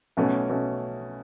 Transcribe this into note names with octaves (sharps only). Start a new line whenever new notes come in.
B1 B2 A3 C#4
B2 A3 C#4